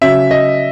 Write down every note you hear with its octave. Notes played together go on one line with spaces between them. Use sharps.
C#3 F#3 C#4 F#4 E5
D#5